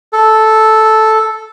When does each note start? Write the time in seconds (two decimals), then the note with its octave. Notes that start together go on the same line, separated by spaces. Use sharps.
0.13 A4